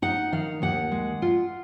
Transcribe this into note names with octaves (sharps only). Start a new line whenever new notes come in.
D#4 F#5
D#3 F5
D#2 F#5
G#3
F4